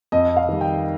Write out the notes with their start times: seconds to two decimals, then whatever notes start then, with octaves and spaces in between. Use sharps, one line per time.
0.12 F2 D#5
0.36 F5
0.49 D#3 G3
0.61 G5